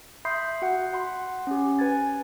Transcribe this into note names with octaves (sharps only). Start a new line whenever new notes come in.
E5 B5 C6 D#6 G6 C7
F#4 F#5
F#5 B5 C6
C#4 G4
B4 G#5 G#6 A6